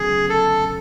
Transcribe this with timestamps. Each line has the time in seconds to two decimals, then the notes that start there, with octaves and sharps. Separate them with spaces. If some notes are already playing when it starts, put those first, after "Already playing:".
Already playing: D2 C#3 F#3 B3 G#4
0.29 A4